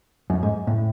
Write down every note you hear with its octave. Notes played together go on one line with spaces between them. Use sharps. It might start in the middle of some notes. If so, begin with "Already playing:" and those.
F#2
G#2
A2